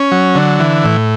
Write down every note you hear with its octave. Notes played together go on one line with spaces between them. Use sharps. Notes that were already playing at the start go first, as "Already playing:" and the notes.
Already playing: C#4
F#3
D3
E3
A2